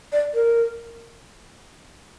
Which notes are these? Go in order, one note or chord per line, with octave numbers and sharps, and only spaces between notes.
D5
A#4